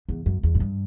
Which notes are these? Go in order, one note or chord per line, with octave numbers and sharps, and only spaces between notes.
E2
F#2
E2
A2
G2